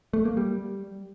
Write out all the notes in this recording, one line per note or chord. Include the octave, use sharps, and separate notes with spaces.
A3
A#3
G3